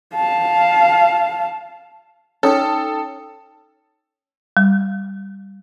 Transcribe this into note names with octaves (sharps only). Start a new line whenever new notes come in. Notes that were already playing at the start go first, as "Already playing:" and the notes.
F5 A5
C#4 D#4 A4 G5 D#6
G3